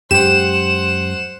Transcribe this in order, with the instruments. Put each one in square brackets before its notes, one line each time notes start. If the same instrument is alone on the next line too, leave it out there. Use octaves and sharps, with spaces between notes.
[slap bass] F#2 G#3 [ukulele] G4 [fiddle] C5 F#5 [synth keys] E7